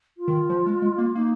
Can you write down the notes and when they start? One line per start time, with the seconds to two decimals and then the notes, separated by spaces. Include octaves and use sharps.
0.18 F4
0.28 D#3
0.50 F3
0.66 G#3
0.82 G#3
0.98 A#3
1.15 A#3 D#4